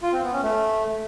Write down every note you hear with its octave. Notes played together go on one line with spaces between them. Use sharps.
F4
C4
B3
C#4
A3